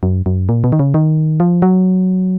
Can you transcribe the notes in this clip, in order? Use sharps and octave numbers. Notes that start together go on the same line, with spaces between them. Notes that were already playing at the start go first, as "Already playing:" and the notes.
F#2
F#2
A#2
B2
D#3
C#3
D#3
F3
F#3